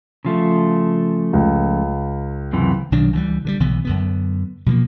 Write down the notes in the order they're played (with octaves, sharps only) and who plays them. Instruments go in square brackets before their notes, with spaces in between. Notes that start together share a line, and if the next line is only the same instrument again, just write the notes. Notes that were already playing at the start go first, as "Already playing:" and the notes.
[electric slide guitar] C#3 F3 A3
[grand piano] C#2
[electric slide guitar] F#2 C3 E3
[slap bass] B1 D#3 F#3 D4
C#2 E3 F#3 G3
D3 D#3 G3
B1 D3 E3 B3
F#2 D3 B3
B2 F3 G#3 A#3